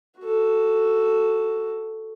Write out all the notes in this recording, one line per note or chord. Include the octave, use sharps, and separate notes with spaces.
F#4 A4